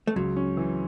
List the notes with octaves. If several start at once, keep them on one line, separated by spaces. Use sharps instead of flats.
A3
C#2 F#3
C#4
E3